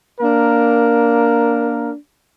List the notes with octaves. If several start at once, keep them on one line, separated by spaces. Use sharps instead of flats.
A#3 D4 A#4